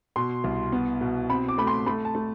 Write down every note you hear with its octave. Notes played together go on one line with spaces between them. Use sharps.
B2 C6
C2
B3
B2
C4 B5
D6
A3 B5
C6
A3 B5
A5
A3